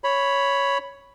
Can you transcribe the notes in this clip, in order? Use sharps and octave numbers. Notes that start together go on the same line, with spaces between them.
C#5 B5